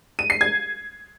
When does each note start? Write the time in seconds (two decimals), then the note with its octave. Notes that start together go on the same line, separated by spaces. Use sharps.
0.19 D#7
0.30 C7
0.41 G#6